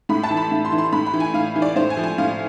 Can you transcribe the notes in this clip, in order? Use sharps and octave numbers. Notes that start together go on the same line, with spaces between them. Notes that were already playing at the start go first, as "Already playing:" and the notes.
A2 B5
A5
E3
B5
A2
C6
E3
C6
A2 B5
B5
E3
G#5
A2 F5
E3
D5
A2 C5
G#5
F3
G#5
A2 F5